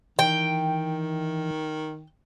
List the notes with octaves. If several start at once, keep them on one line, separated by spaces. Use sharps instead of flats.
D#3 E3 G5